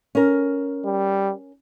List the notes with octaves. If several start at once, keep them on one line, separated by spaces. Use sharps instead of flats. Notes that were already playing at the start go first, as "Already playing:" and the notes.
C#4 A#4
G3